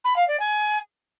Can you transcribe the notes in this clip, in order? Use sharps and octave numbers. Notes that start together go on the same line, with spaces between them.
B5
F5
D5
G#5